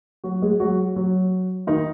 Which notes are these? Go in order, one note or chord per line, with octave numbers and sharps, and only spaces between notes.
F#3 F#4
G#3 G#4
F#3 F#4
F#3 F#4
D#3 D#4